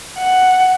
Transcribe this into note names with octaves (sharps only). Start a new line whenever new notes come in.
F#5